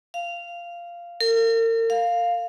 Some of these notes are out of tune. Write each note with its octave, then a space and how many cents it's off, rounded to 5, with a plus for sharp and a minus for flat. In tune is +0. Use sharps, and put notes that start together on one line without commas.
F5 -10
A#4 -40
F5 +5